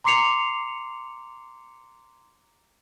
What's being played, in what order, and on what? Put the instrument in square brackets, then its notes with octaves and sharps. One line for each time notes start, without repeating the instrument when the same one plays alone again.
[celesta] A#5 C6 D6 C7 C#7 F7